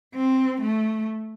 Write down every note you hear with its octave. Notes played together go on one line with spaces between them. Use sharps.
C4
A3